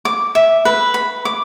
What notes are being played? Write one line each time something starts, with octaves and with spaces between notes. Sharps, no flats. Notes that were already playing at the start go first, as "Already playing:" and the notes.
D6
E5
B4
B5
D6